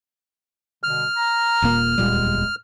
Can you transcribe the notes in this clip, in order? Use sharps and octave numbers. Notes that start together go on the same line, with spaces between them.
B2 D3 G3 F6
A#5
D#1 A#2 A#3
D1 E2 A#2 G3 G#3